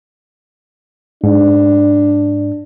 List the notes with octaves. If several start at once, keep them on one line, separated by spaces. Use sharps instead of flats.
G#2 D4